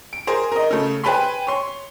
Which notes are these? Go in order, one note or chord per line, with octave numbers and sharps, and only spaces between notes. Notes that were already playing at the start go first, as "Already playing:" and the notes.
D7
G#4 A#4 C5
A#4 D#5
C#3 A3
B4 C5 G5 G#5 B5 C6
C#5 C6